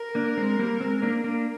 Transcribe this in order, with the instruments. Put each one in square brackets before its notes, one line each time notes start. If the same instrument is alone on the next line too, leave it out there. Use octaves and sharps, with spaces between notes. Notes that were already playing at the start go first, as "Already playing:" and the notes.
Already playing: [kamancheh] A#4
[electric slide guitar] A#3 D4
G#3 C4
G3 A#3
G#3 C4
A#3 D4
A#3 D4